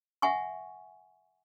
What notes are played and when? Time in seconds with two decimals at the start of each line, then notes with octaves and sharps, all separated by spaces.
0.22 E5 F#5 G#5 C#6